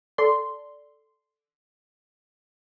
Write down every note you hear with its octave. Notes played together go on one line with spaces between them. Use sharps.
A4 D5 C6